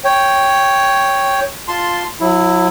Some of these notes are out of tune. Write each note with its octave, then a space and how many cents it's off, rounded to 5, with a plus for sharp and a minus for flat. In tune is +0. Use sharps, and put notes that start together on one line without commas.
C#5 +0 G5 +0
F4 +0 A5 +0 C6 +0
F#3 -35 E4 +0